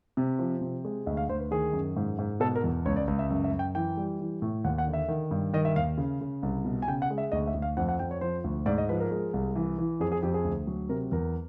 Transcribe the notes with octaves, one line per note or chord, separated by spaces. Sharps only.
C3
F3
C3
G#3
D2 D#5
F5
D2 C5
B4
D#3 G#4
F#2
G#2
G#2
B2 A4
A#4
E2
C#2 C#5
D5
C#2
E5
F#2 E5
E5
F#2
G5
E3 G5
G3
E3
A2
D#2 F#5
F#5
D3
E5
D#3
G2
D#3 D#5
E5
D#2 F5
C#3
C#3
C2
B2
G#5
C#3 G5
F#5
G#3
E5
D2 D#5
E5
D2
F5
F2 F#5
F#5
F2 G5
C#5
F3 C5
D2
G#2 D5
D#5
F3 B4
A#4
G#3
C2
E3
E3
F2 G#4
G#4
F2 G4
G#4
D2
F#3
C3 A#4
E2 A#4